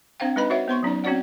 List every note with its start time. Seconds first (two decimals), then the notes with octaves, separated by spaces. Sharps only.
0.20 C4 D4 C5 F5 G5
0.36 G#3 D#4 B4 D#5 B5
0.50 F#4 C5 C#5 E5 F#5
0.68 B3 C5 C6 C#6
0.83 F#3 C#4 D#4 D5
1.04 C4 C#4 F#4 C#5 D5 F#5